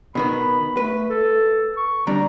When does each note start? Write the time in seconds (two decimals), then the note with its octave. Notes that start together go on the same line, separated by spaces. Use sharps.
0.15 B2 D#3 B3 B5
0.77 A3 B4
1.10 A4
1.77 C#6
2.07 D2 G3 D4 A#5